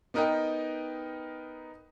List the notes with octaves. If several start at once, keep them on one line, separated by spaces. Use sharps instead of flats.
B3 D#4 A#4 B4 D#5 G5